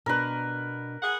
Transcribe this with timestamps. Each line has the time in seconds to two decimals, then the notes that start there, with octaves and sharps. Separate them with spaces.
0.06 B2 D4 A#4 B4 A5
1.02 G#4 F#5